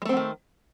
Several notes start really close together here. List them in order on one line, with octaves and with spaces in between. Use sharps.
G#3 A3 C4 F#3 D#3